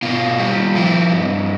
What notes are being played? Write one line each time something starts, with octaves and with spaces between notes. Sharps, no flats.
B2 F4
G3
F3 E4
G2